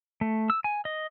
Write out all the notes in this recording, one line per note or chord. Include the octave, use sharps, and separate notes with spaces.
A3
E6
G#5
D#5